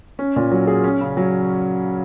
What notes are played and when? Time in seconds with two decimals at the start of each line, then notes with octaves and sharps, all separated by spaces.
0.19 C#4
0.36 A#2
0.52 F#3
0.67 G#4
0.84 C#4
1.01 C#3
1.17 F#3